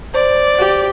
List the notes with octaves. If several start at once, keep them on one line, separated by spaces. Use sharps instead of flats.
C5 D5
G4